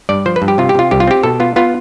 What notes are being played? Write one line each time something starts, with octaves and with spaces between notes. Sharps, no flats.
G2 D5
F3 C5
B4
G2
G4
C3 F4
G4
C3 F4
C2 G4
F4
C4 G4
B2 A4
B3 F4
B3 F4